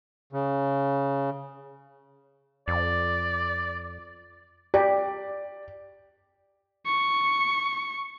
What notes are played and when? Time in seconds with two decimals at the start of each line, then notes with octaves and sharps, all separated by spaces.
0.33 C#3
2.68 F2 D5
4.74 G4 D5
6.86 C#6